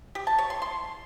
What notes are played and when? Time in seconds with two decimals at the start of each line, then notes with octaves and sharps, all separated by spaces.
0.15 G4
0.27 A5
0.38 C#5
0.50 C6
0.62 C6